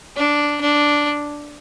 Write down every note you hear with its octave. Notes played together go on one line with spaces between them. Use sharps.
D4
D4